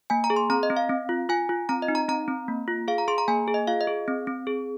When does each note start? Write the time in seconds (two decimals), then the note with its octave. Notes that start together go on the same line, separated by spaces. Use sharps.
0.10 A#3 G#5
0.24 A#5
0.30 G#4
0.36 C6
0.50 C4 A#5
0.63 D#5
0.70 C4
0.77 F5
0.89 C4
1.09 F4
1.29 F4 G#5
1.49 F4
1.69 C4 A#5
1.82 D#5
1.88 D#4
1.95 A#5
2.08 C4 A#5
2.28 C4
2.48 A#3
2.68 F4
2.88 G#4 F5
2.98 A#5
3.08 G#4 C6
3.18 A#5
3.28 A#3 G#5
3.48 G#4
3.54 D#5
3.67 F4 F5
3.81 D#5
3.87 G#4
4.08 C4
4.27 C4
4.47 G#4